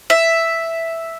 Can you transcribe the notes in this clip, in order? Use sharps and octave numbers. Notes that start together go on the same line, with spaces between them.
E5